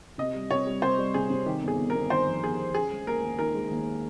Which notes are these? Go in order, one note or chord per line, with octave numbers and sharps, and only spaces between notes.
C3 D#5
G3
C3 C#5
G3
C3 C5
G3
C3 G#4
C3
D#3 G4
G1
G#4
G1
A#4
G1
D#3 C5
F2
G1 G#4
G1
C#4 G#4
G#3
D#2 A#4
D#2
D#3 A#4
G#3
D#2